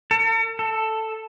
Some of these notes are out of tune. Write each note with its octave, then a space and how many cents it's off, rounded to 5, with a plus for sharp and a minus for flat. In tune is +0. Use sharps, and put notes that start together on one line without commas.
A4 +45
A4 +5